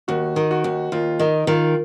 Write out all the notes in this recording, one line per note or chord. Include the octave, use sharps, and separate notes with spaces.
D#2 F#4
D#3
F#4
D#2
D#2 F4
D#3 D#4
D#3 F4